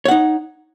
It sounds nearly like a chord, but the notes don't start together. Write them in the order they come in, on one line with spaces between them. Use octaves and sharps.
C#5 F#5 D#4